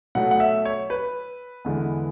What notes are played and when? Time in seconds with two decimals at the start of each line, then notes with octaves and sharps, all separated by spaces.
0.15 B2 F#3 A3 F#5
0.31 F#5
0.40 E5
0.65 C#5
0.90 B4
1.65 E2 D3 G#3 B3